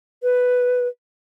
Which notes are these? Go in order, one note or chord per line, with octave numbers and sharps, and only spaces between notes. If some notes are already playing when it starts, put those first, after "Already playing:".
B4